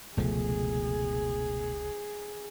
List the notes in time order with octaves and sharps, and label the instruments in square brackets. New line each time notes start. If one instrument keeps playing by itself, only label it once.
[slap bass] F1 C#2 F3 [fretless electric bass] B2 A3 [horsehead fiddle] G#4